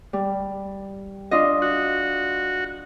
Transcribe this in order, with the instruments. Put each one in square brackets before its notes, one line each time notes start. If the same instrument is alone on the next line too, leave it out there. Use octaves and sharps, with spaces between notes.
[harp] G3
D4 F4 D#5
[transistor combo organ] F#4